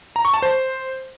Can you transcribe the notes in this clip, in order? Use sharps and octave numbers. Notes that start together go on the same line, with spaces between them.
A#5
C#6
A5
C5